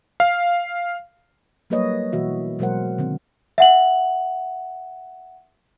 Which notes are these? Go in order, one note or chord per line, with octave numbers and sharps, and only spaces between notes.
F5
F#3 G3 A#3 B4 C#5 D#5
B2 E3 F#4 E5
B2 F#3 G#3 A#4 C5 F#5
D3 D#3 C4
E5 F#5 F#7